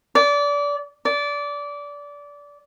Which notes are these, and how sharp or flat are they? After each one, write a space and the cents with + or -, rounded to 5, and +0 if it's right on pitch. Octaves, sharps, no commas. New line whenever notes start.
D5 -25
D5 -20